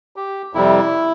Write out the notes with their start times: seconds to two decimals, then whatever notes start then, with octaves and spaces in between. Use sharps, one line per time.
0.16 G4
0.53 F2 C3 G3 E4